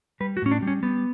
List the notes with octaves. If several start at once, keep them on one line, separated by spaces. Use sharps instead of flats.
G3 B4
F#4
A2 C#4
D4
G3 C#4
G3 B3